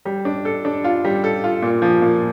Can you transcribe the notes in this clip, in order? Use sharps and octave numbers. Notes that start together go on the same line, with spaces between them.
G3
D4
A4
D4
F4
G3
A4
F4
A#2
F3
A#2